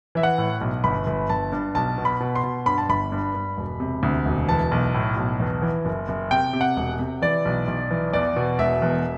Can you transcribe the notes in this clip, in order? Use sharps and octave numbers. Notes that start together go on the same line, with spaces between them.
E3 E5
F#5
A2
B1
G1 B5
G1
G1 A5
G2
B1 A5
B2
B5
B2
C6
B2
G2 B5
A5
G1 B5
G2
G2
E1
C3
D2
E1
E3 A5
B1
A2
B1
E2
E3
F#1
F#1
C3 G5
C3
F#5
E1
C3
E3 D5
B1
B1
E3
E2 D5
B2
E1 E5
E2